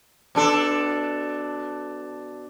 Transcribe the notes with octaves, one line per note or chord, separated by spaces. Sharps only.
B2 D4 A4